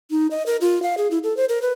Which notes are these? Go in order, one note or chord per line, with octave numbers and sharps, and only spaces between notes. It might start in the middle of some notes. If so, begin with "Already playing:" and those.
D#4
D#5
A#4
F4
F5
G#4
E4
A4
C5
A#4
B4